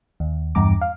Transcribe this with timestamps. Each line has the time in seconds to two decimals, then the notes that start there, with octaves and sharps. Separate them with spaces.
0.20 D#2
0.55 E2 G2 A#5 D6
0.81 F5